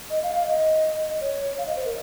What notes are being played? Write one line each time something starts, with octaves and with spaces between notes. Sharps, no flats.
D#5
F5
F5
D#5
C#5
F5
D#5
C5
A#4